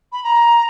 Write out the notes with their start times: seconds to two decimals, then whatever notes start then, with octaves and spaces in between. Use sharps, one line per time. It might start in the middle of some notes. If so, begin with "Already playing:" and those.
0.12 B5
0.24 A#5